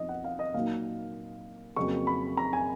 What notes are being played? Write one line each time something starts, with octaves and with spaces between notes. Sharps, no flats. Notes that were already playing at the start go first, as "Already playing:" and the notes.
Already playing: F2 F3 B3 D#4 D#5
F#5
F5
D#5
A#2 F#3 A#3 D#4 F5
F2 C#3 F#3 A#3 C#6
B5
A#5
G#5